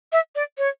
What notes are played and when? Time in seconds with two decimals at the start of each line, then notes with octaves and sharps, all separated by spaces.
0.12 E5
0.35 D5
0.58 C#5